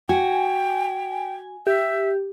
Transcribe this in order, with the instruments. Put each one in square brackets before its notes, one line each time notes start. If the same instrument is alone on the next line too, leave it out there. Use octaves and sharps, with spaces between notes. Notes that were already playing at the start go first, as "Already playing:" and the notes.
[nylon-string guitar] F#4 [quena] G5 [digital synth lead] G#5
[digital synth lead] G4 [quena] E5